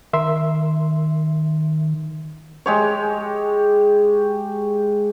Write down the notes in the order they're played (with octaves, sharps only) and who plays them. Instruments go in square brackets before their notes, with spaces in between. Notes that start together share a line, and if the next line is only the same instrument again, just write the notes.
[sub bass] D#3 [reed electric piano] A#4 E5 C6
[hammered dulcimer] G#3 G4 C#5